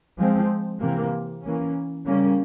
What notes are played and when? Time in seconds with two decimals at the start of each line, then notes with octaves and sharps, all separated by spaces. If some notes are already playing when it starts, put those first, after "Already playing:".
0.18 F3 G#3 C4
0.80 C3 E3 A#3
1.43 E3 A#3 C#4
2.05 C#3 G3 A#3 C#4